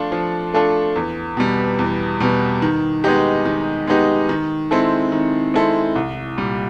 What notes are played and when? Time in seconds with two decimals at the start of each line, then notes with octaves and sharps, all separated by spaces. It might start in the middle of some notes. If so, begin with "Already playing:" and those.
Already playing: F3 A3 D4 F4 A4
0.12 F3
0.54 A3 D4 F4 A4
0.96 E2
1.37 B2 G3
1.79 E2
2.20 B2 G3
2.62 D#3
3.04 G#3 B3 D#4 G4
3.46 D#3
3.87 G#3 B3 D#4 G4
4.29 D#3
4.71 G#3 C4 E4 A4
5.12 D#3
5.54 G#3 C4 E4 A4
5.96 C2
6.37 A#2 G3